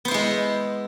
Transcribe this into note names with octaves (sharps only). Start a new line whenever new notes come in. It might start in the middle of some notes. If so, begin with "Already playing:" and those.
G#3 B3 E4 C5